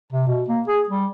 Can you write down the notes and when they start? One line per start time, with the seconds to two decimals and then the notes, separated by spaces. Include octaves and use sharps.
0.12 C3
0.27 B2
0.48 A#3
0.68 G#4
0.89 G3